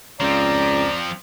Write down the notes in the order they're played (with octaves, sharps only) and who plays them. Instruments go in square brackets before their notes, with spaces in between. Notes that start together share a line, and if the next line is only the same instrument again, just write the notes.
[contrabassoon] C#2 [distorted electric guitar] F3 C4 [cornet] D5 [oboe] A#5